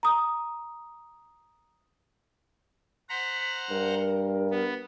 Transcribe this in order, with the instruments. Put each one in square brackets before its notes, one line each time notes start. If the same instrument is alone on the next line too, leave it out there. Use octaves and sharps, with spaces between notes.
[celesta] A#5 D#6
[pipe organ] C5 F#5 A#5 [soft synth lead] B6
[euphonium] G2 [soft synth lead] A#4
[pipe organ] B3